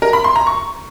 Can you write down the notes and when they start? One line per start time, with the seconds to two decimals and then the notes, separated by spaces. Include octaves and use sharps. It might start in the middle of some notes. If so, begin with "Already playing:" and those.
0.02 A#4
0.13 B5
0.24 C6
0.36 A#5
0.47 C#6